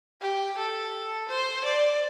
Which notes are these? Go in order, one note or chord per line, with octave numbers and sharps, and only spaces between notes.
G4
A4
C5
D5